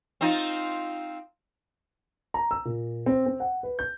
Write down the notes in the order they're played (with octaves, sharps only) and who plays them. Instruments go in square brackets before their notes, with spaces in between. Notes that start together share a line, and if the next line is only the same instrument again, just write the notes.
[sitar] C4 D#4 F4
[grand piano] A#5
E6
A#2
C4
C4
F#5
B4
G6